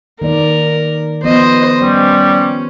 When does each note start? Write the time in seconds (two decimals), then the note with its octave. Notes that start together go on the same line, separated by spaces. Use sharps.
0.22 D#3 A#3 A#4 D5
1.24 F3 B3 C5 D#5
1.81 G3 C#4 C5